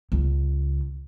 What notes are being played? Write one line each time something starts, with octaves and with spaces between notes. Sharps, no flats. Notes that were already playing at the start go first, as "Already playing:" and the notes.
C#2